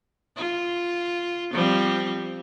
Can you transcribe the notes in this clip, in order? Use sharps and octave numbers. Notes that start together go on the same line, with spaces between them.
F4
F3 G3 C4